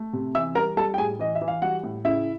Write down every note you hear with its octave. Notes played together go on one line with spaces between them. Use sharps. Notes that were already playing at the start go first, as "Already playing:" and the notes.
Already playing: A3
C3
E3 E5 E6
G3 A#4 A#5
G3 A4 A5
G5
A2 G#4 G#5
E3 D#5
E5
E3
F5
G3 F#4 F#5
A2
C#3 E4 E5